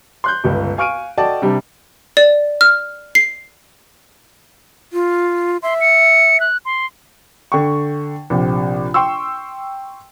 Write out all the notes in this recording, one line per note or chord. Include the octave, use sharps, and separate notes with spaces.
C6 F#6 G6
G1 C#2
F5 G#5 C#6 F6 D7 D#7
F#4 A4 D5 D#5 G5 A5
C3 G3 D4 G4
D5
F6
C7
F4
E5 C6
C#7
F#6
C6
D3 G5 C#6
A#1 C3
G5 C6 C#6 E6